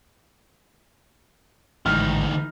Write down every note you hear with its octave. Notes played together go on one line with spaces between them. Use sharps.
A1 D2 G#2 D#3 E3 D#4 F6